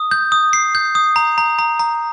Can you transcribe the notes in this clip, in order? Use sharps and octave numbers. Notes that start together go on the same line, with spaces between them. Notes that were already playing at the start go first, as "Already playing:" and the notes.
Already playing: D#6
G6
D#6
C7
G6
D#6
A#5
A#5
A#5
A#5